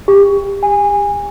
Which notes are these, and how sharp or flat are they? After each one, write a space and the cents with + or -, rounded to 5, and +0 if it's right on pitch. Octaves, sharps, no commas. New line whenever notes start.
G4 +30
G#5 -20